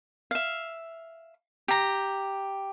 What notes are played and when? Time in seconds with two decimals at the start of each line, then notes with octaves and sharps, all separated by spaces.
0.31 E5 F5
1.68 G4 A#5